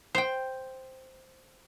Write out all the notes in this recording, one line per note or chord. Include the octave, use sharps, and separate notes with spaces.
C5 G5